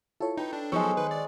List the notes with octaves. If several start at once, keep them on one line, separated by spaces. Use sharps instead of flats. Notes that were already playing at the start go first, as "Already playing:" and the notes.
E4 F4 A4 C#5
D#4 B4 G5
D4
F3 F#3 G#3 B3 D#4 A4 C5 C#5
D#3 B4
D5